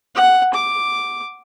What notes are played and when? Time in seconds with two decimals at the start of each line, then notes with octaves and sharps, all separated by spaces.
0.15 F#5
0.54 D6